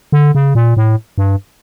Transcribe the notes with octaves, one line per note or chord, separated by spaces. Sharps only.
D3
C#3
A#2
A2
G2